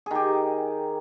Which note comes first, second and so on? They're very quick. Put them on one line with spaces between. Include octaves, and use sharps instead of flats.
G#4 D#3 G4